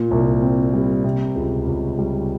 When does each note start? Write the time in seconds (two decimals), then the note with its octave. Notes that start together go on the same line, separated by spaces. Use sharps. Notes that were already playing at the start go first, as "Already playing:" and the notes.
Already playing: A#2
0.11 C2
0.42 C4
0.74 G3
1.04 C3
1.36 C#2
1.67 C#2
1.99 G3